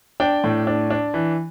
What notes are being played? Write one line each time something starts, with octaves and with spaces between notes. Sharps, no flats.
D4 G5
A2
D4
D4
E3